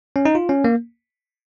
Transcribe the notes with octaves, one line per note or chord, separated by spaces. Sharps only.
C#4
D#4
F4
C#4
A#3